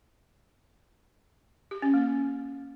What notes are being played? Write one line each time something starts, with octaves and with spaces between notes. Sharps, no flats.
G4
C#4
A#3